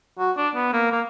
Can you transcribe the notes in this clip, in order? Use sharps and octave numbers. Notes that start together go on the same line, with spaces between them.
F#4
D4
B3
A#3
A#3